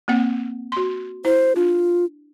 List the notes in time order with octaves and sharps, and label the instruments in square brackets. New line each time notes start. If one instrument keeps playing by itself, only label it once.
[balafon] A#3 C4 F#5
F#4 C6
[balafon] E4 [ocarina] C5
[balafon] D4 [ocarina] F4